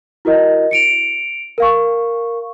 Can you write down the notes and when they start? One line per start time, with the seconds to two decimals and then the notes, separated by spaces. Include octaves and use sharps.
0.25 E4 F#4 A#4 D#5
0.71 C#7 D7 F7
1.58 A#4 F5 C#6